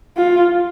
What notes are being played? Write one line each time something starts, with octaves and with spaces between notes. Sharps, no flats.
F4